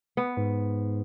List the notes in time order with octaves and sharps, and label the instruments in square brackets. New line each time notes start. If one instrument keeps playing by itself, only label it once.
[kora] B3 [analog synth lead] B4
[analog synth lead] G#2